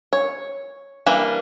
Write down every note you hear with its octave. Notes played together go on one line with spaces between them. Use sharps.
C#5
E3 G3 A#3 D4